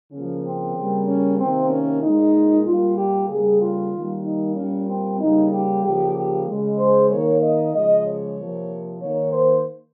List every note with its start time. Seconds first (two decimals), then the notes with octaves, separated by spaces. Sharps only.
0.12 C#3 F3 A#3 C#4
0.44 C4
0.76 C#3 G3 A#3
1.07 C#4
1.39 C3 D#3 A#3 C4
1.70 C#4
2.02 A#2 G#3 D#4
2.66 A#2 G3 A#3 F4
2.97 G4
3.29 C#3 G3 A#3 G#4
3.62 F4
3.93 D#3 G3 A#3
4.25 D#4
4.56 A#2 G3 A#3 C#4
4.89 C4
5.21 C#3 G3 A#3 D#4
5.52 G4
5.83 C#3 F3 A#3 G4
6.16 G4
6.47 C#3 G#3
6.79 C5
7.11 D#3 A#3 C#5
7.42 D#5
7.74 C#3 F3 G#3 D#5
8.06 C#5
8.37 C3 F3 A#3
9.01 D#3 A#3 C#5
9.32 C5